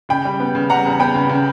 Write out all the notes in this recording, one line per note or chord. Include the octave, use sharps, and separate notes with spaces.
C#3 G5 B5
G3
B3
C#3
G3 F#5 A#5
E2
B3 G5 B5
C#3
C#3